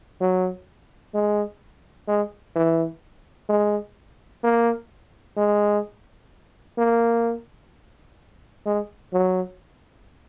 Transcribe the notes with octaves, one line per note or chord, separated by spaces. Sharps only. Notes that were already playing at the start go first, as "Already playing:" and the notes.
F#3
G#3
G#3
E3
G#3
A#3
G#3
A#3
G#3
F#3